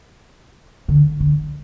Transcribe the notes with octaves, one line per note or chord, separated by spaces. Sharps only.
D3
D3